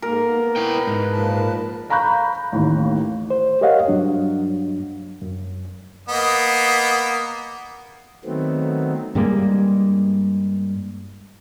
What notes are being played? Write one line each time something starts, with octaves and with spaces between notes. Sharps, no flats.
G#2 A#3 A#4
B3
E4 B4 G5
G#2
A#2 F3 A5
F5 A#5 B5 C#6 F#6 G6
A1 D#2
C5
G4 A#4 C#5 D#5 F5 F#5
G2 F#3 D4
F#2
A#3 B3 D#5
D#3 F#3 A3 B3 C4
G2 G3 G#3 A#3